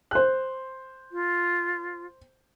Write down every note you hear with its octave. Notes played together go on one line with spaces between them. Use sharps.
C5 F#6
F4